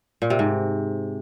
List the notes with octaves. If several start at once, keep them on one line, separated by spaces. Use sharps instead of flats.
A#2
C3
G#2